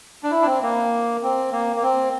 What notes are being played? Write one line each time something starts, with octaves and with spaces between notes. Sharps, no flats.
D4
E4
D4
C4
A#3
C4
A#3
A#3
C4